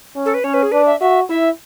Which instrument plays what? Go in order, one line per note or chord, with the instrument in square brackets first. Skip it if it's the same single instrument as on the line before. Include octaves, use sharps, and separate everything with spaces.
[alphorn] C#4
[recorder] A4
B4
[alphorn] C#4 [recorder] C#5
[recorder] B4
G#4
[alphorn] D4 [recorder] B4
[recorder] E5
[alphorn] F#4 [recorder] E5
[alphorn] E4 [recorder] E5